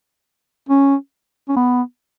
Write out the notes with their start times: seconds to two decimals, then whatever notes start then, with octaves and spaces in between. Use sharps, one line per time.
0.69 C#4
1.49 C#4
1.56 B3